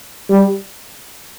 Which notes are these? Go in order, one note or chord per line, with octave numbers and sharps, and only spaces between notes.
G3